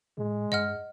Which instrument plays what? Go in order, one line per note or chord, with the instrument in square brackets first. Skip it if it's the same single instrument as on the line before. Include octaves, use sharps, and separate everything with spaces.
[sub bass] A2 [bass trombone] G#3
[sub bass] G2 [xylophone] D#5 F#5 F6